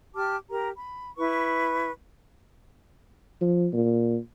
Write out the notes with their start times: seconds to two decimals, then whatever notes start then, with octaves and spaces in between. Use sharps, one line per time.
0.15 G4 A5 D6 F6
0.49 G4 A#4 A#5
0.75 B5
1.17 E4 B4 C#6
3.41 F3
3.73 A#2